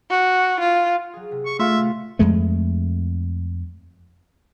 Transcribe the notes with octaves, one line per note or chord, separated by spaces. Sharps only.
F#4
F4
F#3 G#4
C3
C#6
A3 F4 F#4 E5
A2 C3
F2 G#3 A3